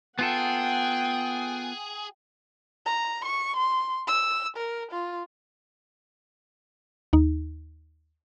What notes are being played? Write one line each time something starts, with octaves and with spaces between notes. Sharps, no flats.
B3 F4 G#4 A4 F#5 G5
A#5
C#6
C6
E6
A#4
F4
D#2 D#4